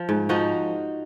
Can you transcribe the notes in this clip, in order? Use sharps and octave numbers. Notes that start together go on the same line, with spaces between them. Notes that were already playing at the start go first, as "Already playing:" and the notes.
Already playing: F3
G#2
F3 D#4 F#4